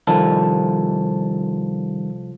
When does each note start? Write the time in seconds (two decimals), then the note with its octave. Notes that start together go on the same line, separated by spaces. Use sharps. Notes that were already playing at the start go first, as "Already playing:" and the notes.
0.07 C2 D#3 F3 G3 A4